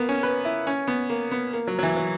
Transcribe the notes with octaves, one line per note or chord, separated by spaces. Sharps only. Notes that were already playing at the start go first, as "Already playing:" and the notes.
Already playing: A#3 B3
C#4
B4
E4
C#4
B3
A#3
B3
A#3
F#3
F#3
E3
F#3